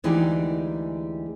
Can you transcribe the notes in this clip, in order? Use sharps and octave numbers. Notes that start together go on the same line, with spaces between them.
D2 E3 G#3 D#4 G4 D5